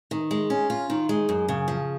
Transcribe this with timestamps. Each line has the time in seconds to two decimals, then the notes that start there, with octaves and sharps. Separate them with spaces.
0.11 D#3
0.31 G#3
0.50 C#4
0.70 F4
0.90 D#3
1.09 G#3
1.29 F#2
1.48 C#3
1.68 F3